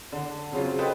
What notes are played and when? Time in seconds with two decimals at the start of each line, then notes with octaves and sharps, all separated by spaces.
0.12 D3
0.52 C#3 F#3 C4 F4
0.79 A4 B4 C5 D#5 G5